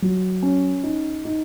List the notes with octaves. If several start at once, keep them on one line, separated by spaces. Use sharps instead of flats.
F#3
C#4
D#4
D#4